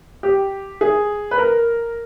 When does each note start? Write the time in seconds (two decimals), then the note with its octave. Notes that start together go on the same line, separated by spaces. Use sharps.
0.23 G4
0.81 G#4
1.31 B4
1.38 A#4